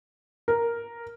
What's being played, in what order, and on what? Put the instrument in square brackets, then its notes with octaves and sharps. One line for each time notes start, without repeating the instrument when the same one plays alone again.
[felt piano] A#4